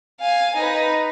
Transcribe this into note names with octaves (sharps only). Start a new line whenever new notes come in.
F5 G#5
D#4 B4